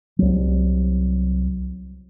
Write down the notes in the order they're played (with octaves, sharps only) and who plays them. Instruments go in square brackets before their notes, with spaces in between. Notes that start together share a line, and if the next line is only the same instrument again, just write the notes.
[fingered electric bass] C2 F#3